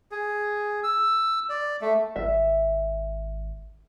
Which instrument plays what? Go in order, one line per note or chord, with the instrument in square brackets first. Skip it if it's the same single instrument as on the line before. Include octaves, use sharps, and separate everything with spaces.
[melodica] G#4
E6
D5
A3
[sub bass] G#1 [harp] E5